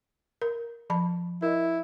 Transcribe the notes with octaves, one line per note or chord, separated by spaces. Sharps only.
A#4
F3 A5 B5
E4 A#4 D#5